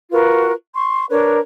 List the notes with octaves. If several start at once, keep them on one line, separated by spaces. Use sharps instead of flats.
F4 F#4 A#4 B4
C6 C#6
D4 A#4 B4 C#5